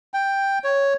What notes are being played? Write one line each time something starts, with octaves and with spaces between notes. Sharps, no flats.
G5
C#5